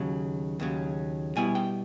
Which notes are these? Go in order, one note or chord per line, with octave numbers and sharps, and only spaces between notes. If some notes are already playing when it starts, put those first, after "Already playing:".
Already playing: D#2 C#3 F#3 A5
D#2 C#3 F#3
B2 G3 B3 E4 G#5
G5